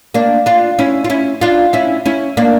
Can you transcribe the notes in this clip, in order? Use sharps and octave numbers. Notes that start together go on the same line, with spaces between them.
A#3 D4
D4 F4
C#4 E4
F4
C#4 E4
D4 F4
C#4 E4
C#4 E4
A#3 D4